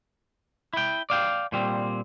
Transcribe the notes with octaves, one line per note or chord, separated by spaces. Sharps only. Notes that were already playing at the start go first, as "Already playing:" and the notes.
E4 G5
D5 F5 G5
A#2 G3 C4